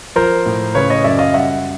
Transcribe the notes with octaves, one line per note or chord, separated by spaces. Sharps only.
F3 A#4 C5
A2
C#3 B4 C#5
C#5 D#5
F#2 D5 E5
D#5 F5
G3 E5 F#5